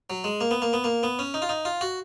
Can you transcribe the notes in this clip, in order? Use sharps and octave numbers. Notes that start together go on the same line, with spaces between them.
F#3
G#3
A#3
B3
A#3
B3
A#3
B3
C#4
D#4
F4
D#4
F4
F#4